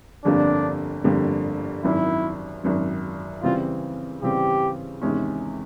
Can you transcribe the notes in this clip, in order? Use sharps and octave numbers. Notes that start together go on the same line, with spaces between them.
G1 F2 D3 G3 A#3 D4
G1 F2 D3 G3 A#3
G#1 F#2 D#3 E4
G#1 F#2 D#3
C#3 E3 G3 C4 F4
C#3 E3 G3 C4 G4
E2 C3 D#3 G#3 C#4